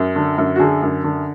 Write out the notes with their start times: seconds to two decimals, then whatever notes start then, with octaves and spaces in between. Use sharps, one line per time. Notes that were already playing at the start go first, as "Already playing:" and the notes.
Already playing: F#2
0.15 D3
0.38 F#2
0.56 F#4
0.59 D3 G#4
0.82 F#2
1.04 D3